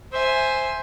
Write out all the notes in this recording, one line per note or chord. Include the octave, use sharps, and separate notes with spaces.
C5 E5 G#5